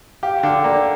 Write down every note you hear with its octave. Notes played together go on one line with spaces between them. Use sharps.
G4 F5
D3 F5
A#3 D5